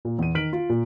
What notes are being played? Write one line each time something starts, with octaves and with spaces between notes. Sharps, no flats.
A#2
E2 D#7
D#3 F6 B6 D7 F#7
F4
A#2